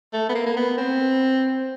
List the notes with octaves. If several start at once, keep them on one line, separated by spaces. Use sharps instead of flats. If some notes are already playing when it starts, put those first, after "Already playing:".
A3
B3
A#3
A#3
B3
C4